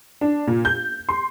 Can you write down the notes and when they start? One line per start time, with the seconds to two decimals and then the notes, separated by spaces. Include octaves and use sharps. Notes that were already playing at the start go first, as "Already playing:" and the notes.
0.21 D4
0.47 A#2
0.65 G6
1.09 C6